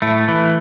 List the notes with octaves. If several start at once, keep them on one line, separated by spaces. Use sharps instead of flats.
A2 A3
E3